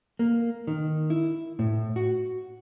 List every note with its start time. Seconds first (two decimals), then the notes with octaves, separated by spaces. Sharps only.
0.19 A#3
0.67 D#3
1.10 E4
1.59 A2
1.96 F#4